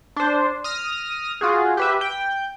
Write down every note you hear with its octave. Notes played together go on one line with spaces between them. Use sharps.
D4 C5
D#6 F6 A#6
F4 F#4 G#4
G4 B4 E5
G5